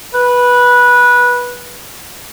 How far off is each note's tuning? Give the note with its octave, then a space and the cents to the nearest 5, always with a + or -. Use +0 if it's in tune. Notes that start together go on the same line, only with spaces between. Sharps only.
B4 -15